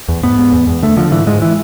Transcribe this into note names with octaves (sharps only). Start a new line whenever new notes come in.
E2
G#2 B3
G#2
E2
E2
D3 A3
D3 F3
G#2 E3
G#2 G#3
E3